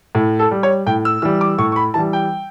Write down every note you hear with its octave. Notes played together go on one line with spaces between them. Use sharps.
A2
A4
G3
C#5
A2 G5
E6
E3 G3 E6
D6
A2 C#6
C#6
B5
E3 G3 A5
G5